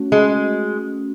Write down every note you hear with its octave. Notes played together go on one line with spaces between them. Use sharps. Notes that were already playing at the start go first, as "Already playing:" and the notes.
Already playing: A3 C#4 F#4
G#3